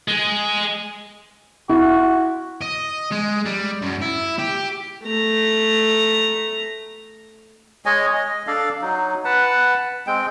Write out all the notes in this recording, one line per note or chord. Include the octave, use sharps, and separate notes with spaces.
G#3 G#4
E4 F#4
D#5
G#3
G3
F#2
E4
G4
A3 A#5
G#3 C#5 D#5 G#5
D#5
D4 A4 D5 F5
F#3 D#4
B4 F#5 A5
G#3 C4 G5